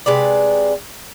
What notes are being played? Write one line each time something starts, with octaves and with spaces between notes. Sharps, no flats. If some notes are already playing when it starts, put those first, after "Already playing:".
C3 G#3 B4 D5